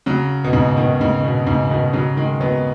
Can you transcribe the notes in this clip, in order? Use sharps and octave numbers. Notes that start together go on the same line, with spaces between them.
C#3 F#3
B2
G#2 C#3
B2 D#3
G#2 C#3
B2
G#2 C#3
B2 D#3
C#3 F#3
D#3 G#3
F#3 B3